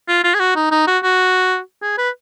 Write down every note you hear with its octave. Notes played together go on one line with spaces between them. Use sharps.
F4
F4
G#4
F#4
D#4
D#4
F#4
F#4
G#4
B4